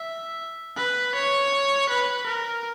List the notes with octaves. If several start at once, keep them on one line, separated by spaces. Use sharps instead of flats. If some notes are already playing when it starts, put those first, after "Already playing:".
Already playing: E5
B4
C#5
B4
A#4